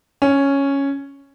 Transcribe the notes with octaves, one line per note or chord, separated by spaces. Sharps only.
C#4